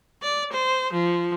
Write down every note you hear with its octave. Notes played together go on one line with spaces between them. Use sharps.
D5
C5
F3